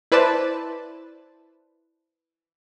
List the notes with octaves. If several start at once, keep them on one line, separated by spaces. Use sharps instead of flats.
E4 B4 C5 D5 A5